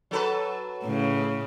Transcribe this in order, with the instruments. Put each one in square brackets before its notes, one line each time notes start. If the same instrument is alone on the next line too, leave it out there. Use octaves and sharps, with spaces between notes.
[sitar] F#3 A4 B4
[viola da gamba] A2 C#3